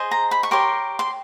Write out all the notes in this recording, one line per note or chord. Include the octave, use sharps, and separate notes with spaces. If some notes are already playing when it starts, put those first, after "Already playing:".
Already playing: G#4 C5 D#5
A#5
B5
C#6
G4 A#4 C#5 C6
C6